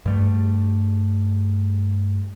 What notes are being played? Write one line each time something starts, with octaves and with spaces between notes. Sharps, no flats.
G2 G3 A3